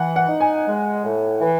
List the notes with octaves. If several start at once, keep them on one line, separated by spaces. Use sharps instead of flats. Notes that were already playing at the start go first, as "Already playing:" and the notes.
Already playing: E3 F#5
F#5
D#4
G#5
G#3
A2
E3